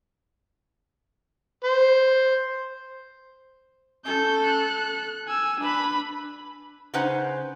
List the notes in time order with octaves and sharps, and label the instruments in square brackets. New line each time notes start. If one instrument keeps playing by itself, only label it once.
[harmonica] C5
[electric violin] C#4 G6 [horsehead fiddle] A4
[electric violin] F#6
G#5 E6
[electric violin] D4 B5 [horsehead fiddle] B4
[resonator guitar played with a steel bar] C#3 C#4 D#4 B4 C5 F#5